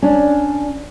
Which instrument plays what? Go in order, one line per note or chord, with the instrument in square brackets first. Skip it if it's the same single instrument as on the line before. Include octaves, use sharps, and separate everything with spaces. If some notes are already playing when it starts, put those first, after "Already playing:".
[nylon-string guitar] C#4 D4